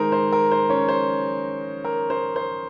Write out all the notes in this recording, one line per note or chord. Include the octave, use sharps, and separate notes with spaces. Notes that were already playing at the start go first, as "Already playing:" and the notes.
Already playing: D#3 G#3 D#4 A#4 C5
C5
A#4
C5
C#4 C#5
C5
A#4
C5
C5